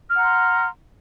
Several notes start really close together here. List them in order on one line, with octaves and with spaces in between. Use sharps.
F6 F#5 A#5 C6